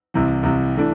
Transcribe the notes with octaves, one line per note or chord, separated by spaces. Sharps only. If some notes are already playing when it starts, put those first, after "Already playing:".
C2 C3 E3
C2 C3 E3
E3 A3 D4